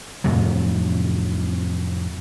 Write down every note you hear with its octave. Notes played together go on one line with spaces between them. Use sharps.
F2 A2 C3 F#3